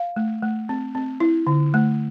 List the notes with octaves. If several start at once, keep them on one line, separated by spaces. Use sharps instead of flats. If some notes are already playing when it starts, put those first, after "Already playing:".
Already playing: F5
A3
A3
C4
C4
E4
D3
A3